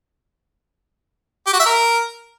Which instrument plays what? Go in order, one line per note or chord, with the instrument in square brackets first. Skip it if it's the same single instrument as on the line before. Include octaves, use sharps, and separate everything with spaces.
[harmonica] G4
F#4
E5
A#4